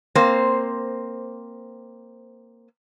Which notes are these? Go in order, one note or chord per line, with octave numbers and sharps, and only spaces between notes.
A#3 C4 C5